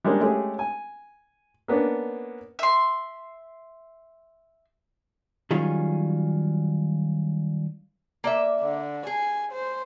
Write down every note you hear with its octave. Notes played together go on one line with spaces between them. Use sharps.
G3 G#3 A#3 C#4 D4
G#3 A3 C#4 G4 G#4
G#5
A#3 B3 C#4 D4
E5 C6
D#3 F#3 G3 C#4 F4 G#4
A#3 D5 E5
D3
G#4 G#5
C5